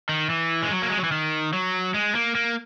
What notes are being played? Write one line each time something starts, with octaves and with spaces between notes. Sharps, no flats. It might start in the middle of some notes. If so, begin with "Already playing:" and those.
D#3
E3
G#3
F#3
A#3
G#3
F#3
E3
D#3
F#3
G#3
A#3
A#3